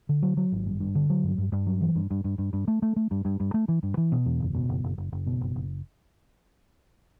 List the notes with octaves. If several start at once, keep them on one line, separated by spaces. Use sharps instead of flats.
D3
F#3
F#3
G#1
G2
G2
D3
F#3
G2
G2
G2
F#3
E3
G2
G2
G2
G2
G2
A3
A3
A3
G2
G2
G2
A3
E3
G2
E3
B2
E2
F#1
B2
F#1
F#1
F#1
F#1
B2
F#1
F#1